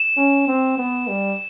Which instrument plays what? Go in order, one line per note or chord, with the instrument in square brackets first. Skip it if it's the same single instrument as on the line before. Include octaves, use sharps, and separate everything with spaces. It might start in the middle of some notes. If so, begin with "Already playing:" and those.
Already playing: [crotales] E7
[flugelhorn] C#4
C4
B3
G3